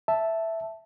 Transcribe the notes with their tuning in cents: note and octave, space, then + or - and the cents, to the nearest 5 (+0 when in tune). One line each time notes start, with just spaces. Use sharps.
E5 +0 A5 +0